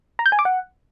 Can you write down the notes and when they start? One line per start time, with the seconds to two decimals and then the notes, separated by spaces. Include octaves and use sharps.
0.19 A#5
0.26 G6
0.32 G#5
0.39 D6
0.45 F#5